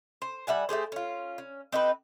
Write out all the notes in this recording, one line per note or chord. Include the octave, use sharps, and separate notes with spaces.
C5
G3 E5 F#5 G#5
A3 G4 G#4 C5
C#4 F4
C#4
C4 D#4 G4 B4